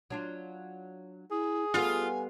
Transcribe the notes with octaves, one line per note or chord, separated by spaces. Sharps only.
F#3 D4 F4
E4 G#4
G3 B3 F4 A4 G#5